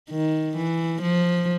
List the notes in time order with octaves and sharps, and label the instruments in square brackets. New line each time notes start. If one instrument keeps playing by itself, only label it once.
[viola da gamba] D#3
E3
F3